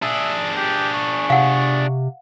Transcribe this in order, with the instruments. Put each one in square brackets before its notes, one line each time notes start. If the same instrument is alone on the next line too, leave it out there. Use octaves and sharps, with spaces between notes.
[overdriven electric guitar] D4 G#4 [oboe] E5
[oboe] G4
C#6
[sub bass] C3 [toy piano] F5 F#5